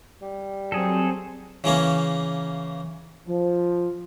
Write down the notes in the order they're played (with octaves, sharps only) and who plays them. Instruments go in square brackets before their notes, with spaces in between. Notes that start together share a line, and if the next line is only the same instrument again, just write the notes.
[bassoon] G3
[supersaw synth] F#3 C4 [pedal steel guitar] G#4 A4
[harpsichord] C#3 E3 A#3 C#4
[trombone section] F3